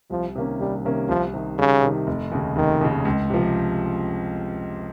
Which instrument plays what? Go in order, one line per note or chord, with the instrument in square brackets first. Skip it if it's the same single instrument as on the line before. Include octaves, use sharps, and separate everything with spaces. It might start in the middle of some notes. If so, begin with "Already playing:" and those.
[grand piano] C2 [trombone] F3
[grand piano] C3 D#3 A#3 C#4
[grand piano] C2 [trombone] G3
[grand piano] C3 D#3 A#3 C#4
[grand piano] C2 [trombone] F3
[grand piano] C3 D#3
[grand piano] C2 [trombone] C#3
[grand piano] C3 D#3
F1
D#2 C#3
[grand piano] F1 [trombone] D#3
[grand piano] D#2 C#3
C#2
C3 F3